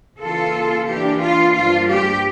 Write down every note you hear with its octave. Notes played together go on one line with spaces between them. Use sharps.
C#3 E3 A#3 F4 A4
E3 A#3 D4 G4
F4
G2 F3 A#3 D4 F4
G4